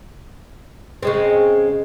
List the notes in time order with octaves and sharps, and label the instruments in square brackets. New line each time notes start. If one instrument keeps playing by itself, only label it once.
[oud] C#3 G#3 C4